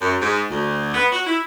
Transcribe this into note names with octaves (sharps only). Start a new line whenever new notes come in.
F#2
G#2
D2
B3
F#4
E4